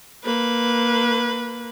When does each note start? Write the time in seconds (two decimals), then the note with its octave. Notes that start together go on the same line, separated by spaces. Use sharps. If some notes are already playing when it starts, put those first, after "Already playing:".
0.24 A#3 B4